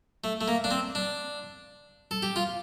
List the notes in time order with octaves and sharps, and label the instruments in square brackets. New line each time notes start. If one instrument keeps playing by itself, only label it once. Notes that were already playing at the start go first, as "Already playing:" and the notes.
[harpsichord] A3
A3
A#3
D4
C4
D4
A4
G4
F4